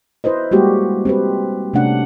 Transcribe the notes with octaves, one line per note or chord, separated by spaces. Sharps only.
E4 B4 C5 D#5
G3 G#3 A#3 F#4 G4
C4 G4 B4
C3 A3 C#4 D4 F#5